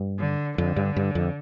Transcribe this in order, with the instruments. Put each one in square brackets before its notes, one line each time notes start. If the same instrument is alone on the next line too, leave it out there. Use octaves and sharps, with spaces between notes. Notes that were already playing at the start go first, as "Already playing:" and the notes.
Already playing: [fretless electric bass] G2
[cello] D3
[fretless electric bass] F2 [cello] D3
[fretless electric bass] G2
G2
F2